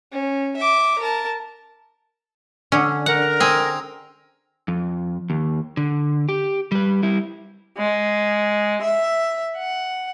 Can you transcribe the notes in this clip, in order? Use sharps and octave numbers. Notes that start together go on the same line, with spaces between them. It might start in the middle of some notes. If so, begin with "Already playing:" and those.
C#4
E5 D6
A#4 A5
D3 C#4
A#4 F#5
C4 G#4
F2
D#2
D3
G4
G3 B4
G3 E4
G#3
E5
F#5